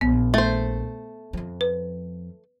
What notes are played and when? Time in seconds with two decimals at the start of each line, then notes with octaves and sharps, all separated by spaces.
0.01 A#1 B3
0.34 A3 C5
1.33 F2 F3
1.61 B4